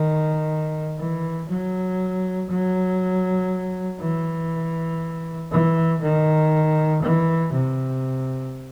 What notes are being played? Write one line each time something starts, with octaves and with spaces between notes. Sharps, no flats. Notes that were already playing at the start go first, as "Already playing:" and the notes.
Already playing: D#3
E3
F#3
F#3
E3
E3
D#3
E3
C3